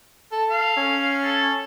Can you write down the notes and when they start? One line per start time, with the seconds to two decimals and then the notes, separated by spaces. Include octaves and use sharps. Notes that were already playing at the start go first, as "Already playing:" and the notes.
0.32 A4
0.50 F5
0.77 C#4
1.23 A4